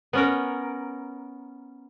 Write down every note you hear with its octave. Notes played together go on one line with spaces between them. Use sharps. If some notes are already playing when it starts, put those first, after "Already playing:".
B3 C#4 A#4